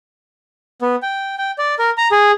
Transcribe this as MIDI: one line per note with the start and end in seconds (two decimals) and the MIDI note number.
0.82 0.96 59
1.02 1.35 79
1.38 1.51 79
1.58 1.75 74
1.79 1.90 70
1.98 2.08 82
2.11 2.32 68